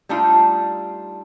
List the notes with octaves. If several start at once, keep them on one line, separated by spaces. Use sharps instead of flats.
G3 A3 D4 D#4 F4